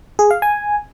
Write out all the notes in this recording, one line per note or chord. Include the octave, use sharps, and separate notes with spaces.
G#4
F5
G#5